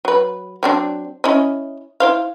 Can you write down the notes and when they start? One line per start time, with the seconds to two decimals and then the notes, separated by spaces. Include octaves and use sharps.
0.05 F#3 B4
0.63 F#3 C4 D4
1.24 C#4 E4 D#5
2.00 E4 C5 F5